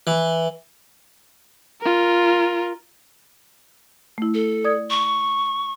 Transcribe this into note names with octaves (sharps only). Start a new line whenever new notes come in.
E3
F4 A#4
A3 E4
A4
D5 D#6 G#6
C#6